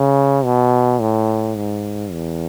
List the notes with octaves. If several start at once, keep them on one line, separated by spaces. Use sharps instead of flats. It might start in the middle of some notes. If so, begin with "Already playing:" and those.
Already playing: C#3
B2
A2
G#2
E2